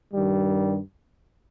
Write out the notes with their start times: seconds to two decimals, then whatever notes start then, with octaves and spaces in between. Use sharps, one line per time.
0.13 G2 D#3 G3